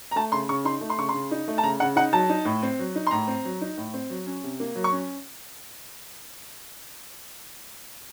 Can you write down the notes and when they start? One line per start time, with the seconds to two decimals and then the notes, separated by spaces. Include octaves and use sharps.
0.11 A#5
0.16 A3 A5
0.32 C#3 C6
0.49 C#3 C#6
0.65 D#4 C6
0.81 A3
0.90 C6
0.98 C#3 C#6
1.09 C6
1.14 C#3
1.31 D#4
1.48 A3
1.58 A5
1.63 C#3 A#5
1.80 C#3 F#5
1.96 D#4 F#5
2.13 F#3 A5
2.29 D#4
2.45 A2
2.63 C4
2.79 F#3
2.96 D#4
3.07 C6
3.11 A2 A#5
3.28 C4
3.45 F#3
3.61 D#4
3.77 A2
3.94 C4
4.10 F#3
4.26 C#4
4.43 C3
4.60 A#3
4.75 F#3
4.84 C#6
4.92 C#4